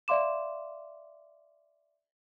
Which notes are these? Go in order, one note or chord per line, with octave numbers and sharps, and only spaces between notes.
D5 E5 F5 C6 D6 E7